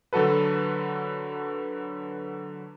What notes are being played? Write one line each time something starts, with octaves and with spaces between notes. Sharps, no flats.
D3 F#3 F#4 A4 B4